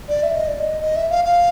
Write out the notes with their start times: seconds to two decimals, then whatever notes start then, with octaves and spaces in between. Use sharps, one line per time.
0.09 D5
0.23 E5
0.35 D#5
0.47 D5
0.59 D#5
0.81 D#5
0.96 E5
1.10 F5
1.25 F5